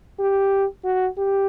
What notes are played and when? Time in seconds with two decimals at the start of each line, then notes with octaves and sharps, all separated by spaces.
0.19 G4
0.84 F#4
1.18 G4